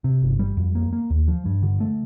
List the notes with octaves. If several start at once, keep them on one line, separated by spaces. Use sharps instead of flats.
C3
G1
G3
F2
A#3
A#3
D#2
F3
G2
D3
A3